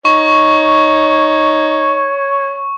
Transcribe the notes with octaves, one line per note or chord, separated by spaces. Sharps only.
D#4 C#5 C#6